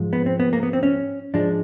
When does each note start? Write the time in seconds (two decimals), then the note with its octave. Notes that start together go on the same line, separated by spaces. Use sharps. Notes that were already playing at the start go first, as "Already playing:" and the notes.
Already playing: G#2 F3 G#3
0.13 B3
0.26 C4
0.40 B3
0.53 A#3
0.63 B3
0.73 C4
0.83 C#4
1.34 G#2 F3 G#3 D4